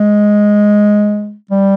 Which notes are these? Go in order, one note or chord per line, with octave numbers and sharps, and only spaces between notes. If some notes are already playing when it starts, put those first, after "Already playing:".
Already playing: G#3
G3